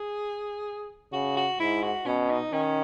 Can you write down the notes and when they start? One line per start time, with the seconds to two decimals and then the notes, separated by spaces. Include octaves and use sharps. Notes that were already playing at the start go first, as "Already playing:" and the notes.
Already playing: G#4
1.13 C#3 F#4
1.37 F#4
1.59 G#2 E4
1.83 F#4
2.06 B2 C#4
2.30 D#4
2.53 D#3 C#4